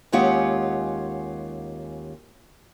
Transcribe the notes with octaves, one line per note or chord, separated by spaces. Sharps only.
D#2 G#3 C#4 F4 G4 F#5